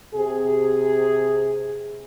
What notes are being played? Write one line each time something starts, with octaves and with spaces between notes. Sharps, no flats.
C3 G#4